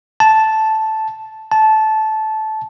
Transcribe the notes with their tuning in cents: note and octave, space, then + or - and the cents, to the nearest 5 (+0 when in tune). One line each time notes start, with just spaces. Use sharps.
A5 -5
A5 -15